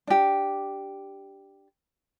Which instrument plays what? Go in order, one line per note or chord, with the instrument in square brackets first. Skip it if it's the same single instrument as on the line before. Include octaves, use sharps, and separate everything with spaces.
[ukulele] D4 G4